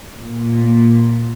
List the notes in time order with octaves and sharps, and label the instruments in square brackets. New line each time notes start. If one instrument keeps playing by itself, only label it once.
[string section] A#2